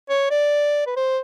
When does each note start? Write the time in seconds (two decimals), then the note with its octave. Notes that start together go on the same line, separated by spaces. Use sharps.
0.09 C#5
0.31 D5
0.86 B4
0.96 C5